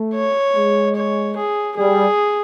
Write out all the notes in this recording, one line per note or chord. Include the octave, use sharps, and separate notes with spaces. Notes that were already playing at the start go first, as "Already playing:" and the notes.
Already playing: A3
C#5
G#3
C#5
G#4
G3 G#4